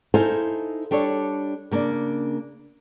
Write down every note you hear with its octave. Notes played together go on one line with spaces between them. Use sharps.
D#4 E4 A4 C5 F5 G#5
G3 D4 A4 C#5
C#3 A#3 D4